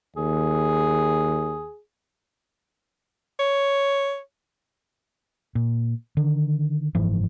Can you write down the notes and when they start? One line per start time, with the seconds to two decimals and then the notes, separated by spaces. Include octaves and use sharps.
0.16 D#2 G#4
3.39 C#5
5.55 A#2
6.17 D3 D#3
6.95 F#1 G#2 E3 F3